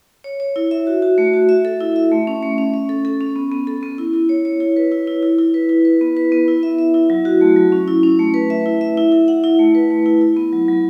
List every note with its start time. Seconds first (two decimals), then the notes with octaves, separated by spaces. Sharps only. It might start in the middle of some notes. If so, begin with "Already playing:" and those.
0.24 C#5
0.40 C#5
0.56 E4
0.71 E5
0.87 F#4
1.02 F#4
1.18 A3
1.33 F#4
1.49 E5
1.65 A4
1.80 E4
1.96 E5
2.11 A3
2.27 C#4
2.43 A3
2.58 C#4
2.74 C#4
2.89 A4
3.05 A4
3.21 C#4
3.36 B3
3.52 B3
3.67 A4
3.83 B3
3.98 E4
4.14 E4
4.29 C#5
4.45 C#5
4.60 E4
4.77 B4
4.92 E4
5.07 E4
5.22 E4
5.38 E4
5.54 B4
5.69 E4
5.85 B4
6.01 B3
6.17 B4
6.32 B3
6.48 E4
6.63 E5
6.79 E5
6.94 E4
7.10 F#3
7.25 F#4
7.41 A3
7.56 F#3
7.72 C#4
7.88 E4
8.03 C#4
8.19 A3
8.34 B4
8.50 E5
8.66 E4
8.81 E5
8.97 E4
9.12 E4
9.28 F#5
9.44 E4
9.59 A3
9.75 B4
9.90 A3
10.06 E4
10.21 E4
10.37 B3
10.53 F#3
10.68 F#3